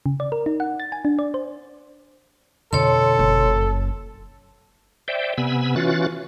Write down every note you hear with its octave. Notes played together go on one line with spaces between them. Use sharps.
C#3
D5
A#4
D#4
F#5
A6
G#5
D4
D5
C5
F2 B2 D3 A4 C#5 C6
F#1
C5 D5 E5 G5
C3 B3 G#5 B5 E6
E3 C#4 F4 F#4 F#6 A6